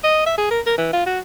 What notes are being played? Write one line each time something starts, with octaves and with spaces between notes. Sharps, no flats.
D#5
E5
G#4
A#4
A#4
E3
F4
F#4